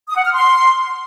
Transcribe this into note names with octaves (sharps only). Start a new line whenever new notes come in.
D#6
F#5
F6
C6